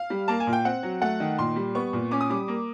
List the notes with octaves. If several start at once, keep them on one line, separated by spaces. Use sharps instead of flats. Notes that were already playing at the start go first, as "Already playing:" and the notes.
Already playing: F5
G3
A#3 A5
G#5
A#2
G5
C4 F#5
F#3
A3 F#5
D#3
A#2 C6
G3
B3 C#6
A#2
C#4 D6
D#6
G3 D6
A#3